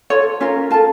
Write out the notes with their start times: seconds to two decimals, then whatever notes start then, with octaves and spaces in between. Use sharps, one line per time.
0.10 F4 A4 C#5
0.41 C#4 F4 A#4
0.71 F4 A4 A5